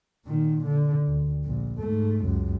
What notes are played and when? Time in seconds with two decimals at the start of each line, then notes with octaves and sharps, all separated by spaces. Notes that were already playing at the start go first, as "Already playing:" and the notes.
0.25 A#2 D#3
0.65 D3
1.07 D2
1.45 A#1
1.79 G#2 A3
2.23 C#2 F#2